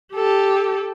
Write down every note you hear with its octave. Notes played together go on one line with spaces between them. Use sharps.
G4 A4